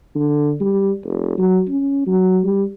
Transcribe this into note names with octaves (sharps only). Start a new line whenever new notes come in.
D3
G3
F1
F#3
C#4
F#3
G3